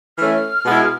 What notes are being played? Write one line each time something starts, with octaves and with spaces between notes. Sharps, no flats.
E3 A3 C#4 F6
B2 G#3 B3 E4